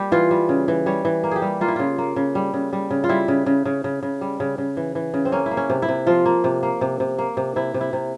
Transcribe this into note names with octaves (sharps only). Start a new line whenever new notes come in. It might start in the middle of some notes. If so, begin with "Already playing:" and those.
Already playing: G3 A#3 G4
E3 F4
G3
C#3
E3
G3 C#5
E3
A#3
G4 G#4
G3
A#3 F4
E4
C#3 F4
A#3
C#3
G3
C#3
G3
C#3
F4
G3 E4
C#3
C#3
C#3
C#3
C#3
G3
C#3
C#3
E3
E3
C#3
C4
A#3 C#4
E4
A#3
C#4
C3
E4
C3
F3 F4
A#3
C3
A#3
C3
C3
A#3
C3
C3 E4
C3
E4
C3